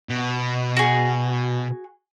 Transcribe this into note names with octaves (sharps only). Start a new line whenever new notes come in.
B2
F#4 G#4